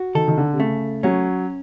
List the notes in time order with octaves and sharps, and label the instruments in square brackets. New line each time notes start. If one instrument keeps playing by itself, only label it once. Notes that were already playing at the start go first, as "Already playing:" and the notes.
Already playing: [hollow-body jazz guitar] F#4
[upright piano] D#3 [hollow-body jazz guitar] A4
[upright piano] D#3
D3
C3
[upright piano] C#3 [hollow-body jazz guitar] A3
[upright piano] F#3 [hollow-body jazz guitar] C#4